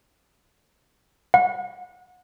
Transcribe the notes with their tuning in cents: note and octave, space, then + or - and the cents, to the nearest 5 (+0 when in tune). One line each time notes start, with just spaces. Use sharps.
F#5 -30